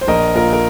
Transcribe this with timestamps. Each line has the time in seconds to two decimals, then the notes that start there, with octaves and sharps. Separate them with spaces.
0.01 C5
0.08 A#1 A#4 D#5
0.35 A#2 F4 A#4
0.53 A#4